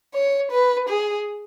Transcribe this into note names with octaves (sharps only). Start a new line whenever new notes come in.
C#5
B4
G#4